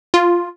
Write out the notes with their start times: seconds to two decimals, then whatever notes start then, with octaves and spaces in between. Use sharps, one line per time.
0.14 F4